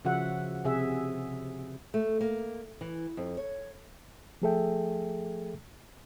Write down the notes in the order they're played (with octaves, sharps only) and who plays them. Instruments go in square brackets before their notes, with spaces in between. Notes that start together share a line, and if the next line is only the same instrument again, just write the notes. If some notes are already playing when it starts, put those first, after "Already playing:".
[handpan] C#3 F3 F#4 E5 F#5
C3 G#4 E5
[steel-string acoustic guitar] A3
A#3
E3
F2
C#5
[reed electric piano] F3 A3 G#4 A4 E5 G5